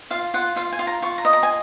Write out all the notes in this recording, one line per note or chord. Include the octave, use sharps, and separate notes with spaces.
F4 F5
F4 F#5
F4 F5
G#5
F4
A#5
F4 C#6
A#5
D#5
A#5
G#5